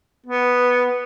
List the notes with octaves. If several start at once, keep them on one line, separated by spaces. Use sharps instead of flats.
B3